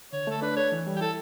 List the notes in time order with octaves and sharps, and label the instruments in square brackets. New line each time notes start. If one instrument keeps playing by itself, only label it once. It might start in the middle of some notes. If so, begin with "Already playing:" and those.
[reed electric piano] D3 [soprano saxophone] C#5
[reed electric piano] A3 [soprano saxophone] A4
[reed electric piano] D4 [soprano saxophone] B4
[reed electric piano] A4 [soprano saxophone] C#5
[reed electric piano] E3
G3
[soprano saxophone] G4
[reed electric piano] E4 [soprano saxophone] A4